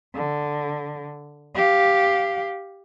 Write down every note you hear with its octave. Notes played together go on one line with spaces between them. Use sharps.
D3
G4 F5